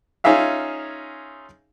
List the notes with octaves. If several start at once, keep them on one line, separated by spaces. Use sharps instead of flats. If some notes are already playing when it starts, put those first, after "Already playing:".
C#4 D#4 F4 G#4 E5 F5